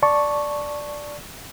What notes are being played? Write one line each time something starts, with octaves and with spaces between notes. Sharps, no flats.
D5 A5 C#6